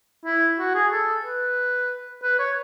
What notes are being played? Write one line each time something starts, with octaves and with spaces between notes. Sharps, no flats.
E4
F#4
G#4
A4
B4
B4
C#5